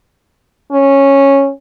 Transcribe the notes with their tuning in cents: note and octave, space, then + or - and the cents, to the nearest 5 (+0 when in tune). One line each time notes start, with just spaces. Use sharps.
C#4 -10